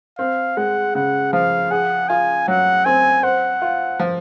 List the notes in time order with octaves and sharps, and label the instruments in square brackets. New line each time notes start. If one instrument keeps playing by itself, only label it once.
[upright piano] C4 [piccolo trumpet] F5
[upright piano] G#3 [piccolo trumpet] F#5
[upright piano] C#3 [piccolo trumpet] F#5
[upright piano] F3 [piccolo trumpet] F5
[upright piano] G#4 [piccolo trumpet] F#5
[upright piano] F4 [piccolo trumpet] G#5
[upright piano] F#3 [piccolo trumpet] F#5
[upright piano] C4 [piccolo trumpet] G#5
[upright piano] C5 [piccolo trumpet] F#5
[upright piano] F4
F3